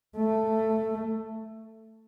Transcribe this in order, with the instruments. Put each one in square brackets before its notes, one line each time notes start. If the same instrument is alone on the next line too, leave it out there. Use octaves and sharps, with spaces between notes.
[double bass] A3